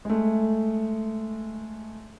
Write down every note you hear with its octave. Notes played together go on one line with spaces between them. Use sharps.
G#3 A3